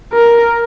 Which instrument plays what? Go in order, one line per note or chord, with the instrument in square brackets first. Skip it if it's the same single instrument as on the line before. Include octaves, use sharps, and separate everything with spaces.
[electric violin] A#4